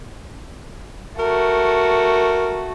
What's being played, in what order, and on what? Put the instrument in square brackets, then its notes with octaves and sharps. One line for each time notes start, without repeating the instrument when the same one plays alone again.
[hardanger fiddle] A3 F#4 [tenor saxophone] A#4